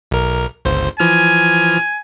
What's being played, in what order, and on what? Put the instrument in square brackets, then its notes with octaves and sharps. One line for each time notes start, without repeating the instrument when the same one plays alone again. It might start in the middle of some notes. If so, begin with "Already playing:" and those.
[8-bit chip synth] B1 A#4
G1 C#2 C5
[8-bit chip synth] E3 F3 F6 [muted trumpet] G#5